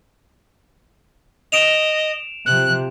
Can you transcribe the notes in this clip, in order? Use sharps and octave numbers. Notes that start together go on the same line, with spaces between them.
D#5 D7 E7 F7
C3 F3 F#6